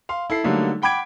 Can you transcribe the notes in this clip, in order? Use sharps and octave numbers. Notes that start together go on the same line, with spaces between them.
F5 C6
E4 A4 C7
D3 F#3 G3 A3 A#3 D#4
F#5 G5 B5 D6 G#6 D7